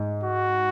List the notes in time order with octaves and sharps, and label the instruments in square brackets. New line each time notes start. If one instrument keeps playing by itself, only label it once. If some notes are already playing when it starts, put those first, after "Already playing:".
Already playing: [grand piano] G#2
[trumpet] F#4